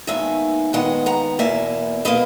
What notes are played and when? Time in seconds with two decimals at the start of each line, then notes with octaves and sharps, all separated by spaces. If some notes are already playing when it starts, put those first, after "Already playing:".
0.07 D#2 D#3 G#3 B3 E5 G#5
0.73 D#2 D#3 G#3 B3 D#5 F#5
1.06 F#5 A#5
1.39 E2 B2 A#3 E5 G#5
2.05 B2 A#3 B4 D#5